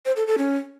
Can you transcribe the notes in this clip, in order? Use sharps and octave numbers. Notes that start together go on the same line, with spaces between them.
C5
A4
A4
C#4